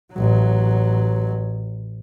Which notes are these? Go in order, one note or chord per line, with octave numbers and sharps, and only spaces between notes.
A1 F#3